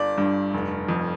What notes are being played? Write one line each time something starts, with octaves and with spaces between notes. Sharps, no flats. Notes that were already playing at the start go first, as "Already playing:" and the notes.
Already playing: G1 G2 D5
G2
F1
F2